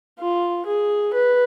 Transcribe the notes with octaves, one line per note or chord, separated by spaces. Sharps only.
F4
G#4
B4